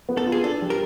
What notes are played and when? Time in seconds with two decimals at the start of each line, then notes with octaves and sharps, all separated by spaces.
0.09 B3
0.17 A4
0.27 F4
0.32 G#4
0.43 D4 A4
0.62 G3
0.70 A#4